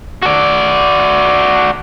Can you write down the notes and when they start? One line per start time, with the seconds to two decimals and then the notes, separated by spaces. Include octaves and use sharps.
0.23 F#4 D5